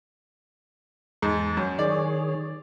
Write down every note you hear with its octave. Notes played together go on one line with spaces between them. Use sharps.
E2 G#2 A5
F#2
D#3 G#4 C#5 D5